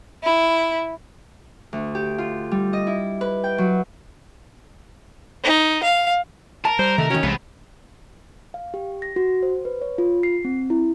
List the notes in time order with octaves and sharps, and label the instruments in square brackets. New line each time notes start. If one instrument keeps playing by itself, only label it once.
[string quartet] E4
[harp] D2
G4
F4
G3
D#5
E4
B4
G5
F#3
[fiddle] D#4
F5
[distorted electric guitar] A#4 [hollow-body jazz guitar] A5
[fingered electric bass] G3 [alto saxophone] C5
[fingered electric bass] C3 [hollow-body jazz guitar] D#3 [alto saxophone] A3
[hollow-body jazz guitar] D#3 F#4 [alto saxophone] C#4
[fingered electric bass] B1 C3 E3 [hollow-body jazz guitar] G#3 [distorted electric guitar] B3 C4
[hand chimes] F5
G4
A#6
F#4
C5
B4
C#5
F4
C7
C4
E4